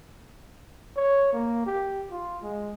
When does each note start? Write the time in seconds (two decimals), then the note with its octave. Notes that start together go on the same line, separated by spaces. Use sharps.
0.97 C#5
1.33 A#3
1.67 G4
2.11 F4
2.43 G#3